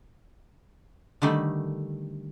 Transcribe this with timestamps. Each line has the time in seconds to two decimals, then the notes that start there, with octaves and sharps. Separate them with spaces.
1.22 D3 D#3 G3 A3